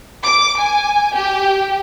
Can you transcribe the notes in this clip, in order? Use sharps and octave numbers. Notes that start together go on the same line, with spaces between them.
D6
G#5
G4